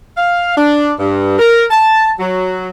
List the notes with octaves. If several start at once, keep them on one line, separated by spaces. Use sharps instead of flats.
F5
D4
G2
A#4
A5
F#3